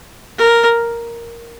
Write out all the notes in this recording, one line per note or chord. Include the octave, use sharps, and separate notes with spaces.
A#4